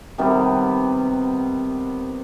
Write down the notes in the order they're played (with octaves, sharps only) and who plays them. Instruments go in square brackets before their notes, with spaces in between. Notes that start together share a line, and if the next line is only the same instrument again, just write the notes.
[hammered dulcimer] C3 D#3 G3 B3